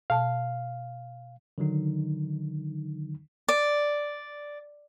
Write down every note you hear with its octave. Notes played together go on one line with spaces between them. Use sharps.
B2 F5 A5
D3 D#3 F#3 D#4
D5